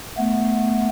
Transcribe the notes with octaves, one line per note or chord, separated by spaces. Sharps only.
A3 B3